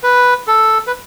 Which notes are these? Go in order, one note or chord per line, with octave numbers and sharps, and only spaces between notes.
B4
A4
B4